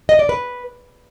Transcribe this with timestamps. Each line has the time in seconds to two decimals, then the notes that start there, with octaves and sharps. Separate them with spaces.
0.09 D#5
0.19 D5
0.29 B4